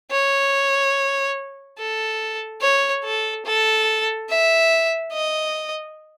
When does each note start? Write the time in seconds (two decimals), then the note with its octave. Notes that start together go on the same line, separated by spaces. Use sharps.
0.11 C#5
1.78 A4
2.61 C#5
3.04 A4
3.45 A4
4.29 E5
5.12 D#5